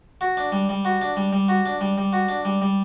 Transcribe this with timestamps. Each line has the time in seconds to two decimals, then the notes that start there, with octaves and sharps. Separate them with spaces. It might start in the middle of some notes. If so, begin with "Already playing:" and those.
0.21 F#4
0.37 D4
0.52 G3
0.69 G3
0.85 F#4
1.01 D4
1.17 G3
1.33 G3
1.48 F#4
1.66 D4
1.81 G3
1.98 G3
2.13 F#4
2.29 D4
2.45 G3
2.62 G3